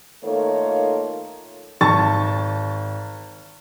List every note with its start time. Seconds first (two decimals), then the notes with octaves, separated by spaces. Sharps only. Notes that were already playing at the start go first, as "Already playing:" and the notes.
0.24 D#3 A3 A#3 F4 A4 C#5
1.81 G#1 A5 C#6 A6